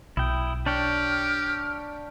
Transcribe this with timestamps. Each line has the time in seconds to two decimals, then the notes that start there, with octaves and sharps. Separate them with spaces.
0.17 B1 E4 G5 D#6
0.66 D4 G4 C#5 G5 F6